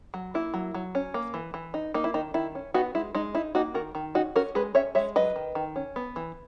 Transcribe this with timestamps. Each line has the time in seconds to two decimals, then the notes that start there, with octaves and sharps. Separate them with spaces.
0.14 F#3
0.34 A#3 E4
0.54 F#3
0.74 F#3
0.95 C#4
1.14 A#3
1.34 E3
1.54 E3
1.74 D#4
1.94 A#3 D#4
2.04 E4
2.14 D#3 D#4
2.34 D#3 E4
2.55 C#4
2.74 B3 D#4 F#4
2.95 G#3 E4
3.15 G#3 D#4
3.35 D#4 E4
3.55 A#3 D#4 F#4
3.74 D#3 F#4 A#4
3.95 D#3
4.15 C#4 D#4 F#4
4.36 C#4 F#4 A#4
4.55 G#3 G#4 B4
4.75 C#4 C#5 E5
4.95 G#3 C#5 E5
5.16 F#3 B4 D#5
5.36 D#3
5.55 D#3
5.76 C#4
5.96 B3
6.16 E3